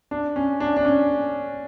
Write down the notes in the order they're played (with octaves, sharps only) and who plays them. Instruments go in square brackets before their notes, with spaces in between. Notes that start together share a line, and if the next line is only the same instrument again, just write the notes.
[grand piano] D4
C#4
D4
D4
C#4